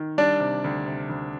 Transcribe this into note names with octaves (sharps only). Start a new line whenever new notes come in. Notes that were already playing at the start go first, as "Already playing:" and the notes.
Already playing: D#3
G3 D4 D5
C3
D2
C3
D2